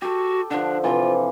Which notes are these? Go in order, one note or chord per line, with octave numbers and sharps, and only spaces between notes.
F#4 G4 A4
D3 F3 D4
C3 E3 F3 F4